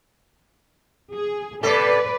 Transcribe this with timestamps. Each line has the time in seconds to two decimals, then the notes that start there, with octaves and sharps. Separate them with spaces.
1.13 G#4
1.63 C3 A4 B4 D5